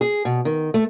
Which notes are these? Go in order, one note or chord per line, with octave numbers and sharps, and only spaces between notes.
G#4
B2
D#3
A3